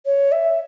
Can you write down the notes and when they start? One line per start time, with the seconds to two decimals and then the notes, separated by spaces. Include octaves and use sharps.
0.06 C#5
0.32 E5